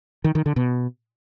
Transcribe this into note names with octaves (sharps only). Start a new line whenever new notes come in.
D#3
D#3
D3
B2